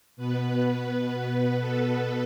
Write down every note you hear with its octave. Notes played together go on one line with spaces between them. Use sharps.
B2 B3 B4
A4